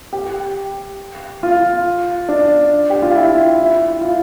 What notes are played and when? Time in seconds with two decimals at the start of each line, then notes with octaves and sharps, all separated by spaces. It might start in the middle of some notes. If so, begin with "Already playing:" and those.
0.13 G4
1.43 F4
2.29 D4
2.90 G4
3.02 F4
3.15 E4
3.59 E4
4.01 F4